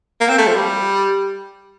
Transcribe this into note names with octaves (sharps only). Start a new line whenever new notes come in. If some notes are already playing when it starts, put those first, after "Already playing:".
A#3
C4
A3
F3
G3